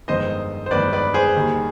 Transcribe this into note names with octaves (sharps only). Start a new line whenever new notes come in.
G1 F2 D#3 G#3 C5 D#5
C5
G1 F2 D#3 G#3 B4 D5
B4 D5
G#4 C5
D#2 D#3 G3